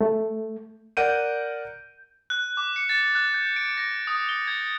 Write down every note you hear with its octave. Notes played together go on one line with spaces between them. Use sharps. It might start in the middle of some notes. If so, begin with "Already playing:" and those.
A3
A#4 D5 F#5 G6 D7 D#7
F#6
D6
C#7
A6
F#6
G6
D7
A#6
D#6
G7
G#6